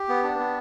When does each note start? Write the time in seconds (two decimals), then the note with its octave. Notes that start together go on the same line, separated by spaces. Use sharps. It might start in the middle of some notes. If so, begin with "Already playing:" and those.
Already playing: G4
0.09 B3
0.23 D4
0.39 B3